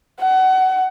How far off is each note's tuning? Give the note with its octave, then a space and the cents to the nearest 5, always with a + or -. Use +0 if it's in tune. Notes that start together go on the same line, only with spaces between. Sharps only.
F#5 +25